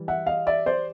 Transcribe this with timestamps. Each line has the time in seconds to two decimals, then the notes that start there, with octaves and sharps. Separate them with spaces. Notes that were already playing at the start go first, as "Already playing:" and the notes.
Already playing: E3 G3
0.08 E5 F#5
0.27 D#5 F5
0.47 D5 E5
0.66 C5 D5